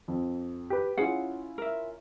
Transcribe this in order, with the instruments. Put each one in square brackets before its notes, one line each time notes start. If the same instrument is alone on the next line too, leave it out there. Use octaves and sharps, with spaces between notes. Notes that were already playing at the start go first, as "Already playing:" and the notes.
[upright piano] F2
G4 B4
[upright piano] C#4 E4 F4 [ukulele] G#4 F#5
[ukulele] A#4 E5